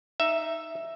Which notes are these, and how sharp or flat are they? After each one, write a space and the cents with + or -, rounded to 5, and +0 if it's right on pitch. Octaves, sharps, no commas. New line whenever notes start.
D#4 +0 E5 +5